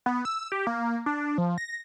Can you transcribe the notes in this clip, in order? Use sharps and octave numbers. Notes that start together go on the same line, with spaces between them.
B3
E6
G4
A#3
D4
F3
A#6